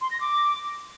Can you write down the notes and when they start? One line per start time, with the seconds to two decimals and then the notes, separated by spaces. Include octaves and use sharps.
0.01 C6
0.11 A#6
0.21 D6